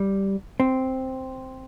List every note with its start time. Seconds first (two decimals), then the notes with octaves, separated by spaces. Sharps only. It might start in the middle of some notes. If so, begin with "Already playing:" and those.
Already playing: G3
0.60 C4